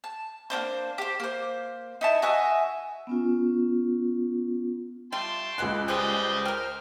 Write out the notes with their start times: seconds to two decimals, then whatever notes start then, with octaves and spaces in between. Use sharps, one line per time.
0.04 A5
0.50 A#3 C4 D4 C5
0.98 G4 C5
1.20 A#3 C5
2.01 D#4 E4 A5
2.22 F#4 D#5 E5 G#5
3.07 B3 C#4 F4
5.12 G3 A3 F4 G5 A5 C6
5.58 C#2 G#3 B3 A4 F#6
5.88 G3 F4 G4 G#4 C5 D#5
6.45 A#4 G5 F6